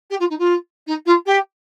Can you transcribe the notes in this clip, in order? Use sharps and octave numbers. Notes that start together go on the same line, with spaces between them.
G4
F4
D#4
F4
D#4
F4
G4